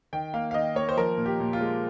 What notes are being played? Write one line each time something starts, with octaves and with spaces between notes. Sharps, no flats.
D#3 G5
A#3 F5
F5
D#3 D#5
A#3 C#5
C5
F3 A#4
A#2
G4
A#2
F4
G#3